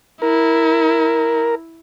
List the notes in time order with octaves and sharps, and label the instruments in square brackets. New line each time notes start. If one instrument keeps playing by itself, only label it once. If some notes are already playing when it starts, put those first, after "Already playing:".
[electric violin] E4 [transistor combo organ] A#4